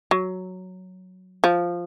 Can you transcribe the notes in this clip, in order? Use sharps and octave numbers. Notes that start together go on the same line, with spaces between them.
F#3
F3